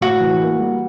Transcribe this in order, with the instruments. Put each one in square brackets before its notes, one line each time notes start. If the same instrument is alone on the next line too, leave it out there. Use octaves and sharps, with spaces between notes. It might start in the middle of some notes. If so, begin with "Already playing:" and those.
[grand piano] A2 [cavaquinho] F#4
[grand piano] E3
A#3
G3